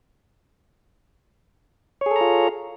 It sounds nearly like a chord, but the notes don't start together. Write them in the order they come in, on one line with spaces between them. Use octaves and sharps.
C#5 G#4 A4 A#5 F4